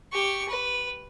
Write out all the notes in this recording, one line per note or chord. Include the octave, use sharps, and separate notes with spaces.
G4 C#6
B4